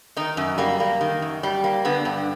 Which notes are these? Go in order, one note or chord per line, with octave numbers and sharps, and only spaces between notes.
D#3 D#4
F#2
G3 A#3
A#3
D#3
F#2
G3
A#3
D3 B3
G2